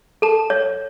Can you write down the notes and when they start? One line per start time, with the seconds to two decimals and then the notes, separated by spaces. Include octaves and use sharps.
0.22 A4 A5
0.50 C#5